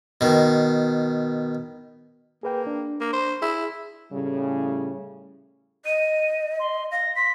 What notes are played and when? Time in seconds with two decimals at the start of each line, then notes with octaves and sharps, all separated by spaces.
0.21 B2 D#3
2.43 A#3 G#4 B4 G5
2.67 D4
3.01 A#3
3.13 C5
3.42 E4 G#4
4.11 A2 C#3 G3
5.85 D#5 D#7
6.59 C6
6.91 F5 A#6
7.15 C6 B6